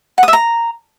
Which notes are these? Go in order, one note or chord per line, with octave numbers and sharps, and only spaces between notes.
F#5
D#6
E5
A#5